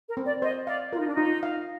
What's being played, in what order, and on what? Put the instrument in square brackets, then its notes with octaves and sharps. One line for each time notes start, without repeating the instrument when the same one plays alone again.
[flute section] A#4
[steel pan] C4
[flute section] D5
[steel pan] C5 [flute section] D#5
[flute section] D5 [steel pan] F5
[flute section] F4 [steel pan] A#4
[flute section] D#4
D4
[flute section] D#4 [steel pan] F4
[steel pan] F5